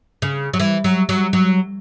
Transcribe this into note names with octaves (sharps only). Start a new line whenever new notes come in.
C#3
F#3
E3
F#3
F#3
F#3